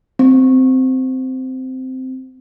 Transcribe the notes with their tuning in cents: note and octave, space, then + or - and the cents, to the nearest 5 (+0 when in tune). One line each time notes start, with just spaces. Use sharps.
C4 -10